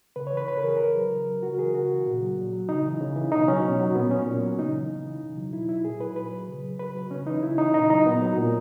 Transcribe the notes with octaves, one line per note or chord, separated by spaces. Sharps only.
C#3 B4
C#5
E3 B4
C#3 B4
A#4
E3 G#4
C#3 A#4
F#3
C#3
F#3
C#3 F#4
A#4
E3 G#4
C#3 F#4
E3
A#2
F#3
A#2
F#3
C#3 D#4
E3
C#3
E3
B2 D#4
F#3 C#4
B2
F#3
A#2 B3
F#3 C#4
A#2
F#3
C#3 D#4
E3
C#3
E3
B2
F#3
B2 E4
F#3 E4
A#2 G#4
F#3 B4
A#2 B4
F#3
C#3
F#3
C#3 B4
F#3
C#3 C#4
E3 D#4
C#3 E4
E3 D#4
A#2 D#4
F#3 D#4
A#2 B3
F#3
A#2